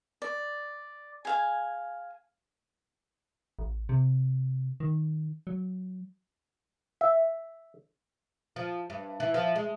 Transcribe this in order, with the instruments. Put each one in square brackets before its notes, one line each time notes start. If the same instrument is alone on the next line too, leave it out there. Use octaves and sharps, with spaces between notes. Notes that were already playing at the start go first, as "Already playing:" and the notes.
[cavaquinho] D5
G#4 F5 G#5
[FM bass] A1
C3
D#3
F#3
[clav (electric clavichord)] E5
[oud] F3
G2
E3
F3
G#3